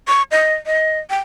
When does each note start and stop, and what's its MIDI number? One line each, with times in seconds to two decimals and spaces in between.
0.08 0.22 85
0.31 0.55 75
0.66 0.99 75
1.10 1.19 79